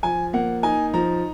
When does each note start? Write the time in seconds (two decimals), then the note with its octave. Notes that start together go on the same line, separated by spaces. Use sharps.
0.03 F3 G#5
0.33 A#3 F#5
0.63 D#4 G#5
0.94 F3 A#5